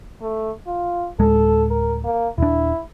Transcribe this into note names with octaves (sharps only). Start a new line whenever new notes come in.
A3
F4
D1 G#3 A4
A#4
A#3
D#1 D4 E4